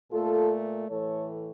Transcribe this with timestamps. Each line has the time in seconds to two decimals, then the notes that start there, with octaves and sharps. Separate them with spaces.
0.12 A#2 A3 F4 A4
0.88 A2 E3 A3 A4 C#5